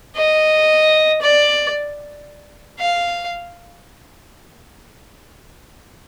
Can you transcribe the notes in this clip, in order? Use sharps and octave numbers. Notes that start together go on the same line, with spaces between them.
D#5
D5
F5